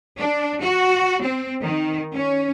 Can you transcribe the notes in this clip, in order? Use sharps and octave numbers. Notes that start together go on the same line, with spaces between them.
D4
F#4
C4
D#3
C#4